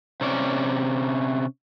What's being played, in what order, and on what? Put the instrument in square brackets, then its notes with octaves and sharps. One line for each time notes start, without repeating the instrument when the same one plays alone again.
[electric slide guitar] C3 C#4 D5